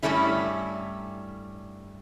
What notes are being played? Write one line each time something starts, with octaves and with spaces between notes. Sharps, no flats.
G2 B2 G3 A3 C#4 E4